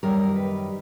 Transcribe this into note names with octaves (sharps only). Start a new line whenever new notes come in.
F#2 D#3 G3 A#4
B4